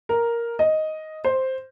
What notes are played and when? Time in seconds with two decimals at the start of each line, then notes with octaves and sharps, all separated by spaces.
0.09 A#4
0.59 D#5
1.25 C5